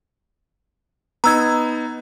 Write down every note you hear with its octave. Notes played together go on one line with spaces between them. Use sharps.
B3 D#4 A#5 E6 G#6